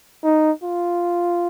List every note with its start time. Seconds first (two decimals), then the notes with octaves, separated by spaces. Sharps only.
0.24 D#4
0.64 F4